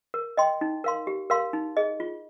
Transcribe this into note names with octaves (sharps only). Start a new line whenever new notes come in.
A#4
D#5 G5 C6
D#4
A#4 F5 C6
G4
A#4 F5 C6
D#4
G#4 D#5
F4